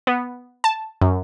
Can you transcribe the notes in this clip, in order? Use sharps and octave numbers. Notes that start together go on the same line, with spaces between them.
B3
A5
F#2